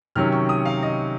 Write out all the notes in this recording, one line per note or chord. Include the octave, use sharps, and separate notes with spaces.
C3 D#3 F#3 C#4 F6
C#6
D#6
F5
D#5